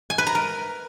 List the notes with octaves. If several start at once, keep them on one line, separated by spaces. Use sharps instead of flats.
G#5
B4
A#5
A#4